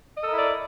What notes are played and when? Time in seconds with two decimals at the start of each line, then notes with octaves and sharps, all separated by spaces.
0.17 D#5
0.22 A4
0.27 A#4
0.32 E4
0.37 D5